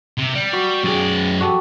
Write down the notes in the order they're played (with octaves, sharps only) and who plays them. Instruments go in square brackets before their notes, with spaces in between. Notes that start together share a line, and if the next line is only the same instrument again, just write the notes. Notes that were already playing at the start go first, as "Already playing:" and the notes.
[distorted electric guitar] C3
G3
[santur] F#4
[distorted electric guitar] F#2 D5 [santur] G4 G#4
[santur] F#4 G4 A4